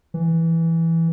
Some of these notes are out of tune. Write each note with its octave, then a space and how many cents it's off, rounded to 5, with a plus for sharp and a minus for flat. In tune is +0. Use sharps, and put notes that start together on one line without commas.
E3 +0